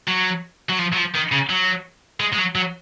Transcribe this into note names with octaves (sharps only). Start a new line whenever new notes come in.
F#3
F#3
F3
F#3
F3
D#3
C#3
F#3
G#3
G#3
F#3
F#3